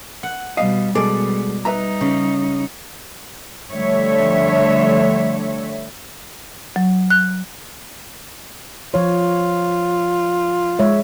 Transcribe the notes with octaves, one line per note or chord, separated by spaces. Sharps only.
F#5
B2 G3 D#5 F5
B2 G3 G#3 G#4 A4 D5
G3 D#4 B4 E5 A#5
C#3
D3 F3 G3 A3 C#5 E5
F#3
F#6
F3 F4 C#5
G#3 C#5 E5